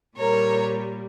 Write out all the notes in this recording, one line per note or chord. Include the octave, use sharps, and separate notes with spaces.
A#2 G3 A#4 C#5